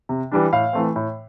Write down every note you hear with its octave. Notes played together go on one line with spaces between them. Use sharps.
C3
E3 G3 D4
A2 F5
E3 A3 C4
A2